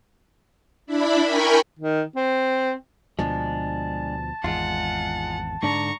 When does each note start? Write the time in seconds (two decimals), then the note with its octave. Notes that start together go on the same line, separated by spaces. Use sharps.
0.86 D4 E4 B5
1.24 A#4 G5 G#5 B5 C#6
1.79 D#3
2.16 C4
3.19 D2 B2 F3 G#3 D4 A5
4.44 G#1 E2 G#3 F4 F#5
5.63 G#2 D3 D4 A#5 C#6